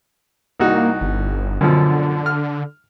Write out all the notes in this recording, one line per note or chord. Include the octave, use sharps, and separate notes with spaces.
C2 A#3 D#4 F#4
G1
F#2 B2 D3 F3
F6